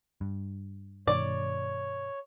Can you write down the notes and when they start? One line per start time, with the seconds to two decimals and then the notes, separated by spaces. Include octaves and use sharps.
0.21 G2
1.07 G2 B2 D#3 C#5 D5